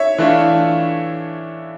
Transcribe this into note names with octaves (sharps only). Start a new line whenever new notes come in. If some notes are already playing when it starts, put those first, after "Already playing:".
Already playing: C#5 E5
E3 A3 D4 F4